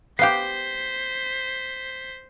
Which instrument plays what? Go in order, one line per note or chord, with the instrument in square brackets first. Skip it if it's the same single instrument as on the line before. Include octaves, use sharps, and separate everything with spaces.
[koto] B3 G4 [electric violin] C5 B6 [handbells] F5 C7